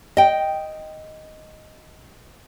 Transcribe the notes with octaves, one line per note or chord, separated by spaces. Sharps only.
D#5 G5